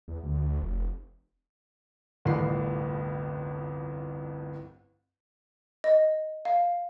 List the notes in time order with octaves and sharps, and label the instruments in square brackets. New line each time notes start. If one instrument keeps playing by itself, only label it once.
[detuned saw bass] E2
D2
F1
[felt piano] G1 C2 F2 A2 C7
[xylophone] D#5
F5